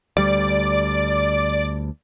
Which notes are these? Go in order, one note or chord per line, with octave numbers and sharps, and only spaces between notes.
D2 G3 D5